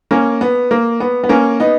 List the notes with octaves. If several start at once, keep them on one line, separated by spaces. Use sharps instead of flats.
A#3 C#4
B3
A#3
B3
B3
A#3 C#4
B3 D#4